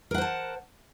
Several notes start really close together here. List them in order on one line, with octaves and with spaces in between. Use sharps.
A#4 F#5 C5 A5